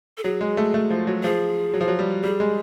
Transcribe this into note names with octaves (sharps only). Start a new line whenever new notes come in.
A4
F#3 G#4
G#3
A3
A3
F3
F#3
F3 G#4
F#3
F3
F#3
G3
G3 G#4
G#3